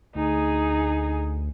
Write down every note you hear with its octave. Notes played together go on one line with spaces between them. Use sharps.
D2 D#4 G#4